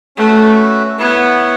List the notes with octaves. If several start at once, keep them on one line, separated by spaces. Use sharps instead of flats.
A3 C#4 F#4 B4 E5
B3 E4 C#5 F#5